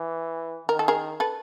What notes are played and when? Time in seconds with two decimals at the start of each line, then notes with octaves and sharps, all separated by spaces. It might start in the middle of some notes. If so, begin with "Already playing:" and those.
Already playing: E3
0.69 D#3 A#4
0.79 A4
0.88 G#4 A#4
1.20 A4 B4